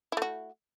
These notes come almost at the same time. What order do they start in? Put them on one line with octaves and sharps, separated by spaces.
E4 A3 F#4